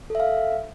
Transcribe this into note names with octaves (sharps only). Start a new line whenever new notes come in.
A4 E5 F5